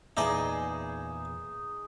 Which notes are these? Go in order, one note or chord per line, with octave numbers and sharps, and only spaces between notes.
E2 A#2 D#4 E4 G#4 D5 D#5